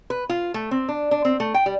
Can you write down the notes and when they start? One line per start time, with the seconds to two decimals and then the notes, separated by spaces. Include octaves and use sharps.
0.10 B4
0.29 F4
0.54 A3
0.71 C4
0.89 D4
1.11 D4
1.25 C4
1.40 A3
1.54 G5
1.66 G3